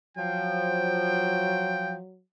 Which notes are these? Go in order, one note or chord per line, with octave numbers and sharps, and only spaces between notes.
F3 F#3 G5